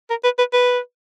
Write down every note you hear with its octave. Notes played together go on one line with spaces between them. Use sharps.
A#4
B4
B4
B4